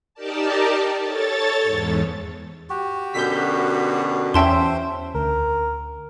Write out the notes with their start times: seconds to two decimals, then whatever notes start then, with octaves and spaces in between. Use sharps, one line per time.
0.14 D#4 G4 A#4 D5 A5
1.03 A4 C#5 A6
1.62 E2 G#2
2.70 F#4 G4
3.14 F#2 B2 D3 G6 B6
4.34 E2 C#4 C5 E5 G5 A5 C6
5.14 D2 A#4